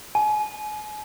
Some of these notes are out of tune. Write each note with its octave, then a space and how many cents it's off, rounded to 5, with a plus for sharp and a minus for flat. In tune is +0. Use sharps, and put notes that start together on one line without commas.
G#5 +35